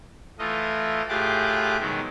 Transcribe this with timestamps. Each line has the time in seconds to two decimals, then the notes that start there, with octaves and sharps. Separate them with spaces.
0.39 E3 A3 F4 D#5
1.09 A2 F4 G4 G#4 D6 F#6
1.80 B2 D#3 F#3 G#3